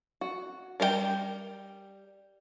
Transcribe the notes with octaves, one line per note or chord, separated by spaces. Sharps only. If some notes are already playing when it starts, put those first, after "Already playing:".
F#4
G3 A#4 C5 G5